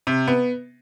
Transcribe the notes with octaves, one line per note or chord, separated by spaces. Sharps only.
C3
B3